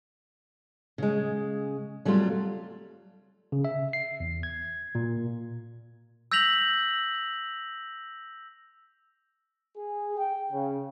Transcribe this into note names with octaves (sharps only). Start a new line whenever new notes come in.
C#3 G#3
F#3 G3 A3 C4 F4
C#3
E5
C7
E2
G#6
A#2
E6 G6 A#6 B6 F7 F#7
G#4
G5
C#3